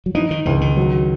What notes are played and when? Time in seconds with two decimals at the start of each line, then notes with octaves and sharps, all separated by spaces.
0.06 F#3
0.15 E3 D#4
0.31 D#3
0.46 C#2 E3
0.61 D#3
0.77 F#3